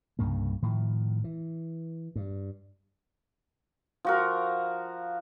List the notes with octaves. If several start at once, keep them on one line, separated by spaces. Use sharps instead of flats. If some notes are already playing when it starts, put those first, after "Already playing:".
C2 G2 C#3 A#3
A2 D#3 F3
E3
G2
F3 F#4 A#4